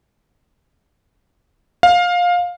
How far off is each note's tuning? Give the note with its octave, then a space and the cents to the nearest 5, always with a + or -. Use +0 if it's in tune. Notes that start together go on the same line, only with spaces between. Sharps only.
F5 +15